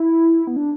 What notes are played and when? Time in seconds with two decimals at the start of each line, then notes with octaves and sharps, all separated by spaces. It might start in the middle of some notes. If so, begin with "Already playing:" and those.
Already playing: E4
0.47 B3
0.56 D4